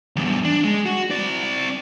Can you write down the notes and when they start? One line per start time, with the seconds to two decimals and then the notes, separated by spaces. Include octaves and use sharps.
0.16 E2 G2
0.45 D4
0.64 G#3
0.86 F#4
1.10 C4 D5